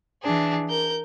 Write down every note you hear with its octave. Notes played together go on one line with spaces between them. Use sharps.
E3 D4 G#4
A#4 G6